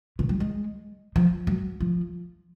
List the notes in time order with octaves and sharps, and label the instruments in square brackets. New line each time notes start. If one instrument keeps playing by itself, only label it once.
[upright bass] C#3
F#3
G#3
F3
F#3
F3